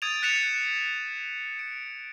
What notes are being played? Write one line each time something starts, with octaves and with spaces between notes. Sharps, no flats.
D#6 G#6 A6 D7 D#7 F7
F#6 A6 B6 C#7 E7 F7
D7